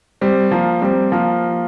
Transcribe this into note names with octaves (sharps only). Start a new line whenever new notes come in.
G3 C4
F3 A#3
G3 C4
F3 A#3